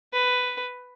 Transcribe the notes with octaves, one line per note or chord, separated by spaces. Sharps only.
B4